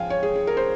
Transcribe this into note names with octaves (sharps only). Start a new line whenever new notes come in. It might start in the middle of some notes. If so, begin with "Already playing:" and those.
Already playing: C#3 F3 F5 G5 G#5
C#5
G#4
G#4
A#4
C5